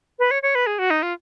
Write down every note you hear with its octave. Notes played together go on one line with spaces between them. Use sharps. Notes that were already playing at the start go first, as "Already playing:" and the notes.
B4
C#5
C#5
B4
G#4
F#4
D#4
F4